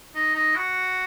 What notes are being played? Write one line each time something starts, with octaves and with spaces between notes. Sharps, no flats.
D#4
D#4
F#4